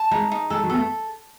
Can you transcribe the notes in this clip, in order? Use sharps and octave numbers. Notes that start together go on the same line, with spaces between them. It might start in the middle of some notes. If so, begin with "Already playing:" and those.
Already playing: A5
G#3 D#4
D#4
G#3 A4
F#3
B3 A4
A3